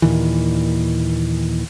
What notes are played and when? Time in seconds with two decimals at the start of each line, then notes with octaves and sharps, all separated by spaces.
0.02 D#2 A#2 D#3 E3